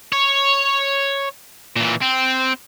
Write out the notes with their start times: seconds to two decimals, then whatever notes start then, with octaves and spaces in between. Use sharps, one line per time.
0.12 C#5
1.76 A#2 E3
2.01 C4